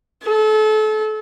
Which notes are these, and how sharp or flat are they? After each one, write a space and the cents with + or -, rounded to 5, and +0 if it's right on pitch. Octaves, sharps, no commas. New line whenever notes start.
A4 -30